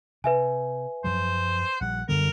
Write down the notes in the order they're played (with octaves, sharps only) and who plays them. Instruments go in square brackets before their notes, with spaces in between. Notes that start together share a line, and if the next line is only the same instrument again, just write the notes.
[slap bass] C3 [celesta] B4 E5 G#5
[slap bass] F#2 F3 F#3 [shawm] C5
[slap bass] A#1 G3 [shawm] F#5
[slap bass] F#2 G3 B3 [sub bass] D3 [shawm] A#4